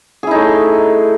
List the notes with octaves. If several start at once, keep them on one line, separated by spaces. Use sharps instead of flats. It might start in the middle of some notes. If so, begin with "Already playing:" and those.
A3 D#4 E4 G#4